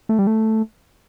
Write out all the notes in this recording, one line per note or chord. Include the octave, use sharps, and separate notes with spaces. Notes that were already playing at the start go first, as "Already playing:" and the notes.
A3
G3
A3